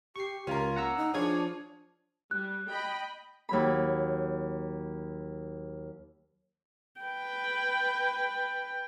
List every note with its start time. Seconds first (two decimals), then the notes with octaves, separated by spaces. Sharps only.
0.16 G4 C#6 C7
0.47 C#2 C#4 F4 A#4
0.76 A#3 F#5 A#5 E6
0.97 D#4
1.14 F3 D4 F4 G#4 C#5 G#6
2.31 G3 F#6
2.70 D#5 G5 B5
3.49 D#2 F#3 B5
7.01 B4 G5